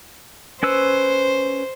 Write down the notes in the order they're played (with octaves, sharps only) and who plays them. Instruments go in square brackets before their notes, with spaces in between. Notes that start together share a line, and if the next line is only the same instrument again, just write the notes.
[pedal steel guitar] C#4 B4 E6 [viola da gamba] C5